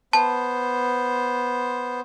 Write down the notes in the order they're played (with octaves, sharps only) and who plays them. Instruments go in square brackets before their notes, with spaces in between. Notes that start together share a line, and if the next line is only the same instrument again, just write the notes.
[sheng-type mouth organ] B3 C5 [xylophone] A5